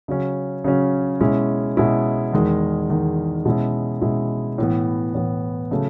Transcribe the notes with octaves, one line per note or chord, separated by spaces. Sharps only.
C#3 F#3 C#4
C#3 F#3 C#4
B2 G#3 C#4 E4
B2 G#3 C#4 E4
E2 D#3 G#3
E2 D#3 G#3
B2 G#3 C#4 E4
B2 G#3 C#4 E4
A2 E3 B3
A2 E3 B3
C#3 F#3 A3